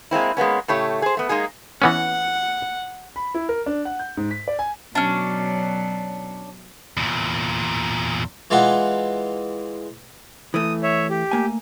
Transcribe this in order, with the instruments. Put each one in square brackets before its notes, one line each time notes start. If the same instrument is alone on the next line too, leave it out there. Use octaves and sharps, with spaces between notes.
[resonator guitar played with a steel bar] G#3 A#3 C4 E4
G#3 A#3 B3 C#4
A2 C#3 A3 G4 C#5
G#4 C5
A3 B3
G#3 A#3 D#4 G#4
[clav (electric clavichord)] E3 B3 C#4 [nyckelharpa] F#5
[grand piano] B5
E4
A#4
D4
F#5
G6
G#2
B6
D5
G#5
[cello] B2 F#3 [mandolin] C#4 D4
[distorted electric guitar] E2 A#2
[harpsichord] E3 G#3 F4 F#5
[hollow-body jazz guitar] E3 A3 [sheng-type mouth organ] D#6
[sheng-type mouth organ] C#5 E5
G4
[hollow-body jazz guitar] A3 A#3 G#5